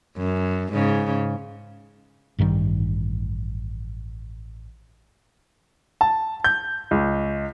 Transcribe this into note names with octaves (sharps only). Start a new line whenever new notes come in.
F#2
G#2 C#3
A1 G2 D#3 G3
A5
G6
C#2